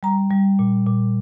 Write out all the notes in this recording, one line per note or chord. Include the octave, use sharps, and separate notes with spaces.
G3 A#5
G3
A#2
A#2